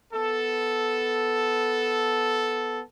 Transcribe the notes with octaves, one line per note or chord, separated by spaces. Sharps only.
B3 A4